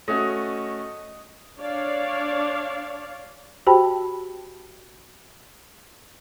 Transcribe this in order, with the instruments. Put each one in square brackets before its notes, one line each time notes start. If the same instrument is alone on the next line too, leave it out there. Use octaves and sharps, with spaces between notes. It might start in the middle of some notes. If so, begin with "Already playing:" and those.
[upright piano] A3 C#4 F#4 [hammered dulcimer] D#5
[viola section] D4 C#5 D5 F5
[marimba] F#4 G4 C5 G5 A5 B5